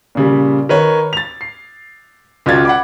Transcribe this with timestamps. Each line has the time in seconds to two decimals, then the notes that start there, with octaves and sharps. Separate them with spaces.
0.15 A#2 C#3 G3
0.69 D#3 B4 C#5
1.13 A6 F7
1.41 C7
2.46 C#2 F4 F#4 D5 G#6 A6
2.65 F#5 B5 D6